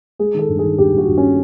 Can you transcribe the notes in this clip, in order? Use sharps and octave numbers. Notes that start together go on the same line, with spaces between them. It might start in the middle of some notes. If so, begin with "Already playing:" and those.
G#3 G#4
D#3 A4
G2
D#3 G#4
G2 G4
G2 F#4
G2
C#4